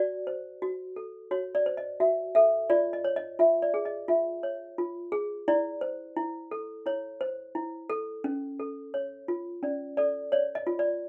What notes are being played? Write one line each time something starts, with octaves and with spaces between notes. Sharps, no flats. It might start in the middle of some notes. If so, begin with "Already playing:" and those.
Already playing: F#4 D5
C5
F#4
A4
F#4 C#5
D5
C5
D#5
F#4 E5
A4 E5
F4 D5
D#5
C#5
D#5
F4 E5
D5
G#4
D#5
F4 E5
C#5
F4
G#4
E4 D5
C5
E4
A4
E4 C#5
C5
E4
A4
C#4
A4
C#5
F4
C#4 D5
A4 D5
C#5 D5
D#5
F4
D5